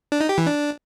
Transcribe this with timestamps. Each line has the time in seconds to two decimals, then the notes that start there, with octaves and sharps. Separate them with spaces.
0.12 D4
0.21 D#4
0.29 G4
0.38 E3
0.47 D4